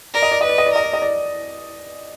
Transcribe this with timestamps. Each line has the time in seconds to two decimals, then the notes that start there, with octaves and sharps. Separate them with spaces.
0.14 A#4 D5
0.22 D#5
0.32 D5
0.41 B4 D#5
0.49 D5
0.58 D#5
0.66 D5
0.73 A#4 D#5
0.84 D5
0.93 D#5
1.02 D5